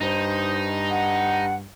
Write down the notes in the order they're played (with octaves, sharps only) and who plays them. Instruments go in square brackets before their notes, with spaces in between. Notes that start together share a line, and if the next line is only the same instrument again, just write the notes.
[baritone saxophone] G2 [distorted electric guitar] D#4 [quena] C5
[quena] F#5